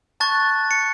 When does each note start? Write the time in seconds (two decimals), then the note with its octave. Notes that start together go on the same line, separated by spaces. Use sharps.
0.20 A5 C#6 F#6 A6
0.71 C#7